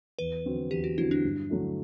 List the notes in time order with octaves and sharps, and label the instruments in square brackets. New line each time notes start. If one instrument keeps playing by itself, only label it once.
[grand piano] E2 [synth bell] B4
[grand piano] D3 F#3 C4 F#4
[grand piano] E2 [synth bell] G4
[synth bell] F#4
[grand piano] D3 F#3 C4 F#4 [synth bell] E4
[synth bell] D4
[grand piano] G2
D3 F#3 A3 E4